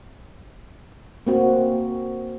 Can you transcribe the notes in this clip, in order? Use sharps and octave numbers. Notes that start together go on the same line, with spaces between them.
A#3 C4 F#4